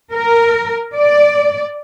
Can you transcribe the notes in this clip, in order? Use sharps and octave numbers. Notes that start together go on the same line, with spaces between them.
A#4
D5